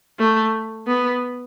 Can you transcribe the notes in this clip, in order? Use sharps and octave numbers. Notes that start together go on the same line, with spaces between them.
A3
B3